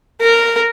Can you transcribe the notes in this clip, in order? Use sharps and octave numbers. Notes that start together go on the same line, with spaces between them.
A#4